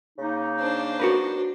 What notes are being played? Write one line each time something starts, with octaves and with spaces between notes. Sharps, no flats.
C#3 A#3 D#4
D4 C5
F#4 A#4 B4